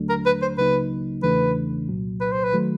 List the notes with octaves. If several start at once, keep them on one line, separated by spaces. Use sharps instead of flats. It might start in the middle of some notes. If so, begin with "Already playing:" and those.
Already playing: D#2 D3 F#3 A3 D4
A#4
B4
C5
C#2 C#3 F#3 A#3 D#4 B4
E2 C#3 E3 A3 D4 B4
C2 A#2 F#3
B4
C5
B4
D#3 F#3 A3